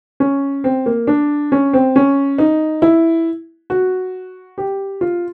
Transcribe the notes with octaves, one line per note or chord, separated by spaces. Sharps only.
C#4
C4
A#3
D4
C#4
C4
C#4
D#4
E4
F#4
G4
F4